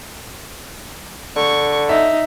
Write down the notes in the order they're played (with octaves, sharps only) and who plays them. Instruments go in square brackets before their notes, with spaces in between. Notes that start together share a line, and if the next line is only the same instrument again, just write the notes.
[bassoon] D3 [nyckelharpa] C#6
[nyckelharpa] D#4 [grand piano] E5